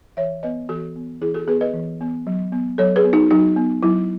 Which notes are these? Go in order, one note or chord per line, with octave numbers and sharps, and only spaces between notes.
E3 C#5 E5
B3 B4 D#5
E3 F#4 A4
B3
E3 E4 G#4
F#4 A4
B3 G#4 B4
B4 D#5
E3
B3
F#3
B3
F#3 A4 C#5
G#4 B4
B3
D#4 F#4
F#3 D#4 F#4
B3
F#3 E4